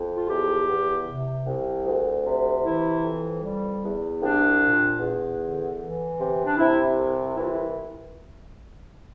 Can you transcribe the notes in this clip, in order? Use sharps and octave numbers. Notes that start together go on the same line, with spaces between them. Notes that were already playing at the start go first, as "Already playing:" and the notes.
Already playing: F2
F4
E2 G4
E2
C3
C2
D2
C3
E3 E4
F2
G3
E2
C2 D4
A#2
E2
D3
E3
C3
D4
C3 E4
C2
E3 E4
F4
E4